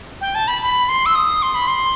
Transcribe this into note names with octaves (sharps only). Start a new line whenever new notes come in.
G5
A5
B5
B5
C6
E6
D#6
C6
B5
C6